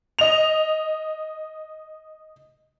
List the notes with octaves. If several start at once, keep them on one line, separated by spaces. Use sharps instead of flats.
D#5 F7